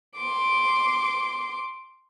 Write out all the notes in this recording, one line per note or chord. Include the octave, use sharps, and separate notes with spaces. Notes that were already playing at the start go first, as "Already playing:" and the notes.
C6 D6